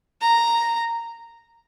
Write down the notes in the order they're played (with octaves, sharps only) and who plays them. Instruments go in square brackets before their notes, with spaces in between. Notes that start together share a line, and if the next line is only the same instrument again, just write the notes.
[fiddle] A#5